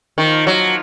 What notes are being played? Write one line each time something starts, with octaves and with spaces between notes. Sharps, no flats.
D#3 F3 A#3 F4
F#3